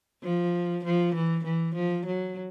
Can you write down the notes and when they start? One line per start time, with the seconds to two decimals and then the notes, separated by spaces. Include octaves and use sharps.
0.23 F3
0.84 F3
1.15 E3
1.44 E3
1.75 F3
2.06 F#3